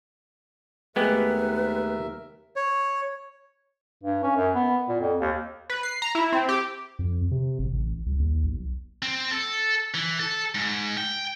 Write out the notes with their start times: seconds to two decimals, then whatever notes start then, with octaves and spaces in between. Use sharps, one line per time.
0.96 D#2 G#3 A3 B3 G4 A#4 B4 E5
2.56 C#5
4.03 G2
4.23 C#4
4.36 F#2
4.55 B3
4.89 A#2
5.00 F2
5.21 D#2
5.70 B4
5.83 C7
6.02 A#5
6.15 E4
6.33 C4
6.49 G4
6.99 F2
7.31 C3
7.59 G1
7.72 A1
8.06 C2
8.19 D#2
8.44 B1
9.03 C4
9.31 A4
9.94 E3
10.20 A4
10.55 G#2
10.97 G5